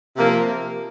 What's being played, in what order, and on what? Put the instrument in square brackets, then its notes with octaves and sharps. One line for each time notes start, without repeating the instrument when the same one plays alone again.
[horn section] C3 F3 A#3